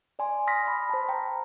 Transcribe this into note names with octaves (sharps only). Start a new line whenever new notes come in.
D5 G#5 C6
C6 D#6 F6 A#6 B6
B5
C5 A5
G5 A#5